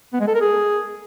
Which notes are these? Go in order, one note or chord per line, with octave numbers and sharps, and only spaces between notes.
B3
G#3
A4
A#4
G#4